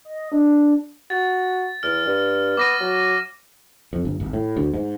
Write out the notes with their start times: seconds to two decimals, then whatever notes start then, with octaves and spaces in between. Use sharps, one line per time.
0.05 D#5
0.32 D4
1.10 F#4 A6
1.83 E2 F6
2.06 G2
2.57 B3 D6 A#6 D#7
2.80 F#3
3.93 F2
4.05 G1
4.20 G#1
4.33 A2
4.56 D2
4.74 G#2